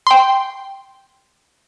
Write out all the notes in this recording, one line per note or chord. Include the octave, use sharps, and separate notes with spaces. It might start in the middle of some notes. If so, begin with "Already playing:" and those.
G5 C6